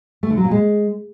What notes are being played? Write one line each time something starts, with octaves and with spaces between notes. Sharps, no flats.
A3
D3
F#3
A#2
G#3